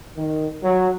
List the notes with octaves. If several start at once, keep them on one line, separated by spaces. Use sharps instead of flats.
D#3
F#3